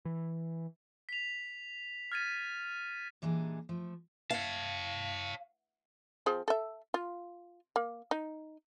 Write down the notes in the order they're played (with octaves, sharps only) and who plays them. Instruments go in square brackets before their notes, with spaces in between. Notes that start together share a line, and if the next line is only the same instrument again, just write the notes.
[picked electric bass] E3
[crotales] B6 F7
F6 G#6 A6 B6 D#7
[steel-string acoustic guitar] A#2 E3 G3 D4 D#4 G#4
F3 A3
[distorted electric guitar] C#5 A5 [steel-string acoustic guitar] F5
[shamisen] F3 C4 G#4
A4 E5
F4
A#3
D#4